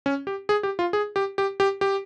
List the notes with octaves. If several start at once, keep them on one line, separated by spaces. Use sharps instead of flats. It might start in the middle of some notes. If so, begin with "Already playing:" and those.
C#4
G4
G#4
G4
F4
G#4
G4
G4
G4
G4